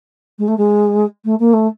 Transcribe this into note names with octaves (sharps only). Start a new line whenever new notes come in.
G#3
A3
G#3
A3
A#3
A3